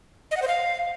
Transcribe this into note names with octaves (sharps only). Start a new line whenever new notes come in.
D#5
F#5
C5
F5